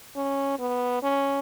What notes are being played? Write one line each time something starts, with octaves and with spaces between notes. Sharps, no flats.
C#4
B3
C#4